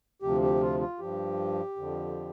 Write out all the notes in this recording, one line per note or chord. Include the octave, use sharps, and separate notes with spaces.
D2 C3 F3 G4
G4
F4
F4
G2 F3 G4
F2 D3 F3